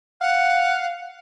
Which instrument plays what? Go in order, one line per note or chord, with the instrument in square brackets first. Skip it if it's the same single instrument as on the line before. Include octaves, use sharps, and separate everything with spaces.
[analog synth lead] F5 [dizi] F#5